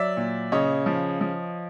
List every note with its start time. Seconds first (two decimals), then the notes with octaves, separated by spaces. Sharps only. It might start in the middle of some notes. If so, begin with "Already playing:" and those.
Already playing: F#3 D5 E5
0.17 A#2
0.52 C#3 C#5 D#5
0.86 F3
1.21 F3